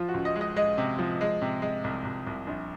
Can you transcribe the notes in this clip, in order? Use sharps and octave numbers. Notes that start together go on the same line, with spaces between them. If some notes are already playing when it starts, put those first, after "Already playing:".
Already playing: F3 F4
F#4
C#2
D#5
G#3
D#5
G#3 D#5
C3
F3
G#3
C3
G#3
C2
C2
C2
A#1